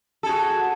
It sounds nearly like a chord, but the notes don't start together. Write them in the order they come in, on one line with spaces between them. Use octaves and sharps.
A4 G#4 F#4